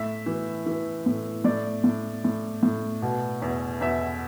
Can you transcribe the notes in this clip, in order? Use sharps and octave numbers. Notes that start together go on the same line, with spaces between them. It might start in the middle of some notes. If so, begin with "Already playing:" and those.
Already playing: A2 E5
E3
E3
A2
A2 D5
A2
A2
A2
B2
E2
E2 E5